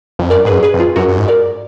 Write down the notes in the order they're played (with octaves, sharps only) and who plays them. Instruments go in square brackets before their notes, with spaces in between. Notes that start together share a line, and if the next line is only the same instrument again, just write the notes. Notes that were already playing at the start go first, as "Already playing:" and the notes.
[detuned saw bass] F2
[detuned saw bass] F#2 [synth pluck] A#4 D5
[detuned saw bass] G#2 [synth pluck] G#4 B4
[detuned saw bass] F#2
[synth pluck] G#4 B4
[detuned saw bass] F2
[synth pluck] F4 G#4
[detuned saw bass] F#2 [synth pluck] F#4 A#4
[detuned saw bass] F#2
G#2
[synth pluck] A#4 D5